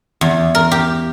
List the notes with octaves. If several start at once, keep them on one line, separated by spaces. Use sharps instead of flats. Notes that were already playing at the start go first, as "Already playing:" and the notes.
E2
A#4
G4